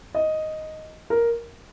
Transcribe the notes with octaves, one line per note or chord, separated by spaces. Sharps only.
D#5
A#4